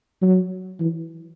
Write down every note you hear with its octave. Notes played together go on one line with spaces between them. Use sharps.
F#3
E3